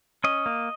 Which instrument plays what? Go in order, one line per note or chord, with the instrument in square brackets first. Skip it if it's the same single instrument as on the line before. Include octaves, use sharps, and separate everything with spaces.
[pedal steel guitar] C#4 D#5
A#3